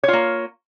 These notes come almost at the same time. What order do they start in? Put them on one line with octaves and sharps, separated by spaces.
C#5 F4 A#3